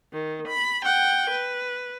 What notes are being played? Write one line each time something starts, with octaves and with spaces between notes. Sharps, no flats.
D#3
B5
F#5 G5
B4